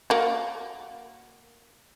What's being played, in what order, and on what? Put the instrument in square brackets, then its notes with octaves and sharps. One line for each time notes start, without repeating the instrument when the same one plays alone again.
[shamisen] A#3 F#4